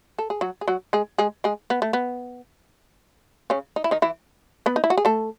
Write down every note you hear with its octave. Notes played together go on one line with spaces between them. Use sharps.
A4
G#4
F#3 F#4
G#4
F#3 F#4
G#3 G#4
G#3 G#4
G#3 G#4
B3
A3
B3
C#3 C#4
D#4
E4
D#3 D#4
E3 E4
B3 B4
D#4
E4
F#4
G#4
A3 A4